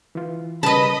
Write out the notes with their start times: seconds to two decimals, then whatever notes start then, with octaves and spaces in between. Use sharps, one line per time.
0.15 E3 F4
0.63 C#3 G3 A#4 B4 D#5 A5 B5